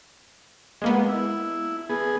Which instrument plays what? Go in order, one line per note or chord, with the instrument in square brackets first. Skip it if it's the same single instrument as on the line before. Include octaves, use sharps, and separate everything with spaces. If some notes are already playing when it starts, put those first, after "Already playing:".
[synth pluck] G#3 A#3 B3
[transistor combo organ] E4
B3 G#4